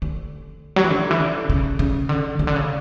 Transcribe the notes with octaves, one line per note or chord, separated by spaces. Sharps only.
D3
F#3
E3
D3
E3
D3
C#3
C#3
D3
C#3
D3
C#3